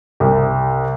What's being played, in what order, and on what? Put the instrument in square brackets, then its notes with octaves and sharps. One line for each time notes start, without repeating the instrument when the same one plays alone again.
[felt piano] C2